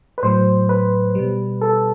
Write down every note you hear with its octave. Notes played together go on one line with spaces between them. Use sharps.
B4
A2 F#3 C5
B4
B2 G3
A4